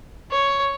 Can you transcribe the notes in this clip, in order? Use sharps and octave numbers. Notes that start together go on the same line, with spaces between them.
C#5